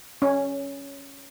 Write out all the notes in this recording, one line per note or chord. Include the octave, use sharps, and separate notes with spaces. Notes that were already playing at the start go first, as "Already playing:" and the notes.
C#4